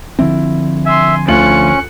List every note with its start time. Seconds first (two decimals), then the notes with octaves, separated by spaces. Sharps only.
0.19 D3 F3 C4 E4
0.86 E5 G#5 C6
1.28 D2 C#4 F4 F#6 C#7 F#7